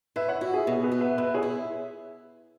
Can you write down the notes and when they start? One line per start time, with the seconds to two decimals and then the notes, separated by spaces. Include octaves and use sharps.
0.16 E4 B4 E5
0.28 C#5 F#5
0.41 E4 F#4
0.54 G#4
0.67 B2 G#4
0.84 F#4 B4
0.92 B3
1.00 B4 E5
1.18 B2 B4 E5
1.34 G#4 C#5
1.43 E4